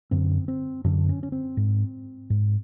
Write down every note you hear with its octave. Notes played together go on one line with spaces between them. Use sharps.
F#2 D3 C4
C4
F#2 D3 D4
C#4
C#4
C4
G#2
G#2